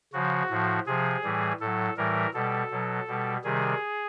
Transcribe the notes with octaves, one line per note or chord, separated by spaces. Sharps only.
C#3 F3 F#4
A2 F3
C3 F3 G#4
A2 E3 G3
A2 F#3 A4
A2 E3 G3 A#4
B2 G3 A4
B2 F#3
B2 G3
C3 D#3 G3 G#4